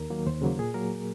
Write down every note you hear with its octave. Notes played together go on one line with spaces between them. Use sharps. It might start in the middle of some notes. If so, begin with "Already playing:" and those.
Already playing: D#2 A#4
D#3 F#3 A#3
D#2 C5
C#3 F#3 A#3
A#2 G#4
F#3 A#3 A#4